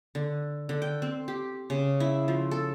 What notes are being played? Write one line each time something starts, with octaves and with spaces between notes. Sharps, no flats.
D3
D3
G5
C4
G4
C#3
E4
F3
A4